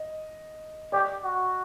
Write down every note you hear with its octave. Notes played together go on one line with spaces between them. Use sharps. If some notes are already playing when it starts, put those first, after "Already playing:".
Already playing: D#5
G4 D5
F#4